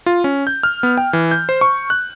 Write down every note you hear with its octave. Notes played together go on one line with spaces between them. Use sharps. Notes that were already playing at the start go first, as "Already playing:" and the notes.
F4
C#4
G6
F6
B3
G5
E3
G6
C5
C#6
F#6